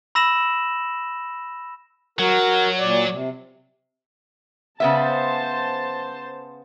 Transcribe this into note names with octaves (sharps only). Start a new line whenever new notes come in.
B5 E6 A#6 E7 F#7
F#3 F#4 A#4
A#2 D5
C3
C#3 B3 C5 E5 A5